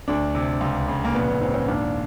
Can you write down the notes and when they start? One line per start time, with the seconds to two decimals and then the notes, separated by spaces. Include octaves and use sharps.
0.08 D2 D4
0.35 C3
0.61 C#2
0.88 C#3
1.05 A#3
1.14 A#1 B3
1.28 B3
1.41 G#2 C4
1.54 C#4
1.68 D#2 D4